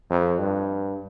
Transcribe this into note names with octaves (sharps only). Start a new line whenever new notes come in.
F2
G2